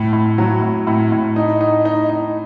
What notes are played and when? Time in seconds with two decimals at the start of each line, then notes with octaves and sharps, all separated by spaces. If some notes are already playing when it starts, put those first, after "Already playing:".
Already playing: A2
0.13 A2
0.38 F#3
0.62 A2
0.87 A2
1.12 A2
1.36 D#4
1.61 D#4
1.85 D#4
2.09 D#4